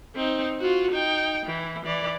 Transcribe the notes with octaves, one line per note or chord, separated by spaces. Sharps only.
C4 D#4
F4 F#4
D#4 G5
E3
E3 D5